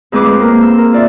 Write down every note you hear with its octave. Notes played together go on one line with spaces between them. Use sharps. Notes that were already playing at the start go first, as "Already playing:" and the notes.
F2 G#3 C4 G#4 B4 D6
G#3
A#3 A#4 C5
E6
A#4
F4 D5 E5